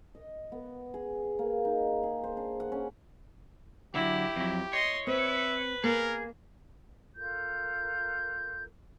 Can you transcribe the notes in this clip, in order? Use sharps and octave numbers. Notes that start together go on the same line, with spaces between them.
D#5
B3
G#4
A#3
D#4
G#4
C5
D4
F#5
C#4
D3 F#3 E4 G4
F2 F#3
C#5 D#5 C6
C4 B4 E5
A#3 G#4 A#4
F4 A4 A#4 G6